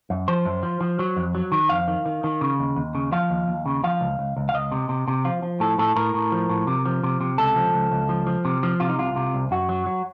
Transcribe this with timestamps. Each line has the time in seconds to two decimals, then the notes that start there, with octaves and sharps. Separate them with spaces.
0.10 F#2
0.28 F3 C5
0.45 F#2
0.63 F3
0.81 F3
0.99 F#3
1.17 F2
1.35 F#3
1.52 D#3
1.69 F2 F5
1.88 D#3
2.06 D#3
2.24 D#3
2.41 C#3
2.59 D#2
2.76 D#2
2.95 C#3
3.12 F3 F5
3.30 D#2
3.48 D#2
3.66 C#3
3.84 F3 F5
4.01 C#2
4.19 C#2
4.37 C#2
4.49 F5
4.54 C#2 D#5
4.72 C3
4.89 C3
5.08 C3
5.25 F3 F4
5.43 F3
5.60 A2 A4
5.79 A2 A4
5.96 A2 A#4
6.14 A2
6.32 F3
6.49 A2
6.67 C3
6.86 F3
7.03 C3
7.21 C3
7.38 C#2 A4
7.56 F3
7.74 C#2
7.92 C#2
8.09 F3
8.27 F3
8.45 C3
8.63 F3
8.80 C3 F4
8.89 D#4
8.99 C2 F4
9.16 C3
9.34 C2
9.51 F#2 F#4
9.69 F#3
9.86 F#3